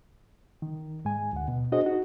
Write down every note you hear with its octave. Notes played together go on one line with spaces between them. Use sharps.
D#3
G#2 G#3 G#5
D2 F#5
B2
D4 F#4 G#4 C5 D#5
D#4 F#4